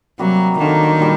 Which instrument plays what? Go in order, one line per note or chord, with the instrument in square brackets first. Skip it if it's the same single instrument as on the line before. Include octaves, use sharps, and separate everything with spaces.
[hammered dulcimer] C3 G3 A#3 F#4 [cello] F#3
[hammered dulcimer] D3 F#3 A#3 D4 [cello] D#3
[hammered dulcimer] A#2 G3